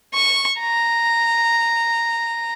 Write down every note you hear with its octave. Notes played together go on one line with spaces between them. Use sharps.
C#6
A#5